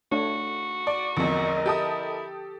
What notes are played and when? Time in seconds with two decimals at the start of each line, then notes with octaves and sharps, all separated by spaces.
0.12 A3 D4 F#4 C#5
0.87 D5
1.17 A1 E2 D3 F3 C4 A#4 D#5
1.66 E4 G4 A4 D#6